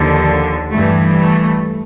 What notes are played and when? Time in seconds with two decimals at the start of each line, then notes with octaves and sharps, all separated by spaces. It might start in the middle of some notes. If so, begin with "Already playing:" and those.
Already playing: D#2 D3 F3
0.71 G2 E3 G3 A3
1.18 A3